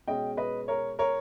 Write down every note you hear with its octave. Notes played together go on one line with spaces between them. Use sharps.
B2 G#3 C#4 D#5 G5
B4 D#5
A#4 C#5
A#4 C#5